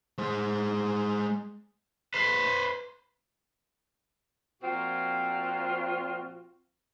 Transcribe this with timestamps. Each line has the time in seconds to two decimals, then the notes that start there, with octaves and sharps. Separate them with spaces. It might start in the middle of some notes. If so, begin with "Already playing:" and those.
0.18 G#3 C5
2.14 B4 C5
4.62 A#2 F3 C4 F4 F#4